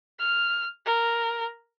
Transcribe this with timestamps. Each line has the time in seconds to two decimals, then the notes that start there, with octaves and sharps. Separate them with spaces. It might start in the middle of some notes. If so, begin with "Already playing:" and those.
0.19 F6
0.85 A#4